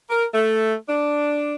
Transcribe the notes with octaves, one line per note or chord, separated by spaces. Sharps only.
A#4
A3
D4